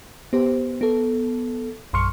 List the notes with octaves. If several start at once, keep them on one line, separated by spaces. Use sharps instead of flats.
B3 G4 C5
B3 A4
A#1 F#2 C6 C#6 F6 C#7